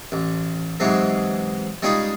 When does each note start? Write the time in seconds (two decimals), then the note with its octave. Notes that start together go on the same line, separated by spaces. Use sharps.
0.12 A1
0.80 G#2 C3 E3 F#3 G#3
1.82 G3 G#3 C#4 D#4 F4 G#4